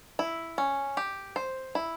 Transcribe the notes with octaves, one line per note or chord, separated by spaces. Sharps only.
E4
C#4
G4
C5
E4